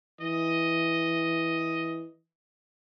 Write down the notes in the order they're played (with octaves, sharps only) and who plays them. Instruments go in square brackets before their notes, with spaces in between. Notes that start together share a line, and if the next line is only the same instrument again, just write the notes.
[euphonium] E3 [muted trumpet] D#5